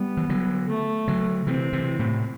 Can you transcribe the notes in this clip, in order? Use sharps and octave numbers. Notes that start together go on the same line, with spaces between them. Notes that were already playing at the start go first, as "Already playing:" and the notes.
Already playing: G3 B3
E3
D3 F#3
A3
D3 F#3
C3 E3 C4
C3 E3
A2 C3